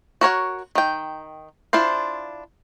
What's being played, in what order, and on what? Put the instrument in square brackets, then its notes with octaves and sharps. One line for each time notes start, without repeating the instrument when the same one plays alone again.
[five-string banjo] F#4 A#4 C#5 F#5
D#3 G5
D4 E4 F4 C5